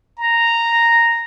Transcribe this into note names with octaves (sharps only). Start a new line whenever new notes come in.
A#5